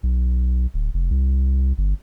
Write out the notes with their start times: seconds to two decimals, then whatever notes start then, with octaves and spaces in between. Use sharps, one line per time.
0.03 B1
0.74 D1
0.94 F1
1.11 C2
1.78 G1